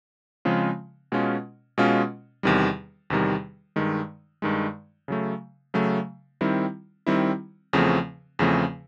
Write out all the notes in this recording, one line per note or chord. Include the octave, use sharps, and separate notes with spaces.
C#3 F3 G#3 C4 F4
B2 G#3 C#4 F4
B2 G#3 C#4 F4
E2 C3 D#3 G3
E2 C3 D#3 G3
G2 D#3 G#3
G2 D#3 G#3
C#3 F#3 A3
C#3 F#3 A3
D#3 G3 C4 E4
D#3 G3 C4 E4
E2 C#3 F3 A3 C4
E2 C#3 F3 A3 C4